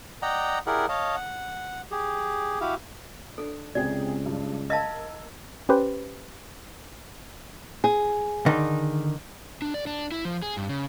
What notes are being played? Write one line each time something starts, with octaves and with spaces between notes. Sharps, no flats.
D5 D#5 F#5 G5 A#5
E4 G4 G#4 A#4 D5 F#5
C#5 D#5 F5 A5
F#5
G4 G#4
E4 F#4 G4 F5
D4 A4
C#2 C3 G#4 D5 G5
G2
A#4 D#5 F5 A5 E6 G#6
C#4 G4 B4 C5
G#4
D3 D#3 D#4
D4
D5
D4
E4
F3
G#4
G2
C#3